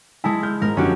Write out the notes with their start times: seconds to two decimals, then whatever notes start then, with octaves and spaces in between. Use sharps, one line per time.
0.24 G#3 E4 G#5 A5
0.43 F6 G6
0.62 G#2 A#4
0.77 F#2 D3 F3 C#4 F#4 G4